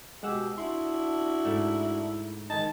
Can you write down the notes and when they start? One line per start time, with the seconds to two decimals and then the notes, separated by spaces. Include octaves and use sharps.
0.23 B2 G#3 G4 G#4 F#5 E6
0.58 D4 E4 F#4 C6
1.45 G#2 A3
2.50 D#3 G#3 D#4 A5